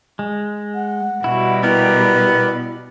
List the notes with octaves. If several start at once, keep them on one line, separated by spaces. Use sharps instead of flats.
G#3
F#5
B2 G3 E4 F#4
B3 E4 G4 A#4